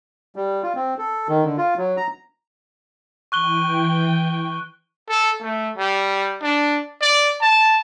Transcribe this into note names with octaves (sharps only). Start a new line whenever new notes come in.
G3
F4
C4
A4
D#3
D3
F4
F#3
A#5
E3 G5 C#6 F#6 G7
A4
A3
G3
D4
D5
A5